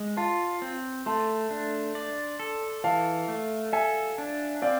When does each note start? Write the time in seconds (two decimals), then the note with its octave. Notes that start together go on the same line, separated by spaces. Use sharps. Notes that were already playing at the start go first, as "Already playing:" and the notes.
Already playing: G#3
0.17 F4 A5 C6
0.62 C4
1.06 A3 A5 C6
1.51 D4
1.95 D5
2.40 A4
2.84 E3 F5 A5
3.28 A3
3.73 A4 E5 G#5
4.18 D4
4.62 C4 D5 F5